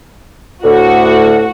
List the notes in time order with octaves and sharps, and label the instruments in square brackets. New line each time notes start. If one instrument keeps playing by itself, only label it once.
[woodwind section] D2 A2 [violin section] F#4